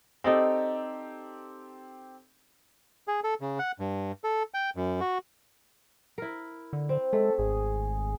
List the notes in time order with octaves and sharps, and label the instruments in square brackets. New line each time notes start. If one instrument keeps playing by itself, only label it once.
[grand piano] C4 G4 A4 [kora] D#4 D5 D#5
[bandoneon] G#4
A4
C#3
F#5
G2
A4
G5
F#2
F#4
[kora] E4 A#4
[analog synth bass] D3
[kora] C4
[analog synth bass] G#3 [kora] A3 [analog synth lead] A4
[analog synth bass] G#1 [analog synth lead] G#4